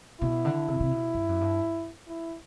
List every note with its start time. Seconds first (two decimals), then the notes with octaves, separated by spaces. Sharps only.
0.22 B2 E4
0.45 D3
0.68 C3
0.80 C3
0.91 B2
1.15 G2
1.29 F#2
1.41 G2
2.08 E4